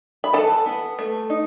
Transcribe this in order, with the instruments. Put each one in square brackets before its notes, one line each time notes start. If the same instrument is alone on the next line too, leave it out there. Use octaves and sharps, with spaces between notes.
[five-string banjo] B5
E3 A4 A5
B3
A3
D#4